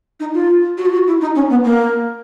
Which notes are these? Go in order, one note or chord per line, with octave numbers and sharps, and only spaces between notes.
D#4
F4
F#4
F4
F#4
E4
D#4
C#4
B3
A#3